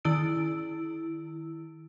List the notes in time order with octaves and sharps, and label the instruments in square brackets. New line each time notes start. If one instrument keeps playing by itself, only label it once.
[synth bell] D#3 E4 E6 D7